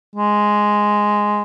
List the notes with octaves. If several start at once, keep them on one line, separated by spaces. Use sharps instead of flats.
G#3